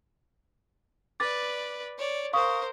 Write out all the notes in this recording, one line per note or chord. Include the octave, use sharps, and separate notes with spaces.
B4 D5 D6 A6
C#5 D5
A#4 C5 F5 C#6 D#6